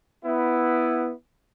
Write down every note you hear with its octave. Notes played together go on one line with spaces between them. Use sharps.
B3 E4